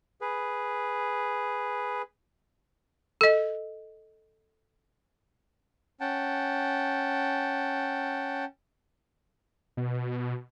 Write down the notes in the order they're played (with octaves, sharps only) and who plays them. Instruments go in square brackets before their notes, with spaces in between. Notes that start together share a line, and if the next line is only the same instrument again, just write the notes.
[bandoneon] G#4 B4
[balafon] A4 D#5
[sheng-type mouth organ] C#4 F#5 G5 A5
[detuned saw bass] B2